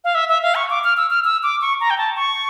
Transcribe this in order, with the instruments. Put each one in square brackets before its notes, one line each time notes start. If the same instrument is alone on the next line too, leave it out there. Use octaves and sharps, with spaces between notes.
[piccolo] F5
E5
E5
F5
C#6
D6
F6
E6
F6
E6
D6
C#6
A#5
G5
A5
C#6